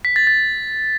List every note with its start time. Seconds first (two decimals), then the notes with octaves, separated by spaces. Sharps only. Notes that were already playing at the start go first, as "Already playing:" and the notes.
0.05 B6
0.16 A6
0.27 A6